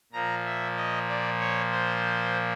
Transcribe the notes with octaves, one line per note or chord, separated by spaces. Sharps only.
A#2 F3 A#3 A#5
E5
D#5
D5
C#5
C5